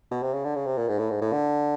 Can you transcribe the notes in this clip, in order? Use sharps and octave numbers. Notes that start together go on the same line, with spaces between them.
B2
C3
C#3
D3
C#3
C3
A#2
G#2
A2
G#2
A2
D3